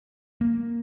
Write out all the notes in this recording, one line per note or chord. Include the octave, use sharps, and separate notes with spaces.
A#3